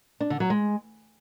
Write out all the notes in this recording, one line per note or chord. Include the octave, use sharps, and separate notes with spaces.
D4
D3
F#3
G#3